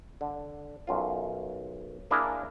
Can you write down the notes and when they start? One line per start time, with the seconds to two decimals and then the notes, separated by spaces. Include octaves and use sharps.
0.21 D3
0.87 B1 F#2 F4
2.11 A#3 D4 E4 G#4 A#4